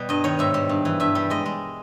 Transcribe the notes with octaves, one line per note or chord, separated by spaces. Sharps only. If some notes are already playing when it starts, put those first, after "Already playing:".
Already playing: B2 G3
G2 D#5
D#3 C#5
G#2 E5
G3
G2
E3
G2 E5
G3
G#3 D#5
G#3